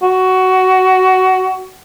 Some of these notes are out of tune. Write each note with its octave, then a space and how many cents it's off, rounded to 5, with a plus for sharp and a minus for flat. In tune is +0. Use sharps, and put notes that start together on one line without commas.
F#4 +15